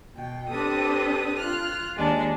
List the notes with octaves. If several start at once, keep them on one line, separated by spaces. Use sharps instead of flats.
B2 G5
C4 D4 G4 A4 B4 D#6
F4 F6 F#6
D#2 G#3 D4